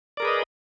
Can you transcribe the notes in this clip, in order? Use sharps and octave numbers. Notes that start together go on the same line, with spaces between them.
G#4 A#4 B4 D5 D#5